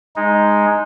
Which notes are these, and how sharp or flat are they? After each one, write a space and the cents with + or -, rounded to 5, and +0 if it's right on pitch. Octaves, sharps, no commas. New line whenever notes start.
G#3 +0 D#4 +0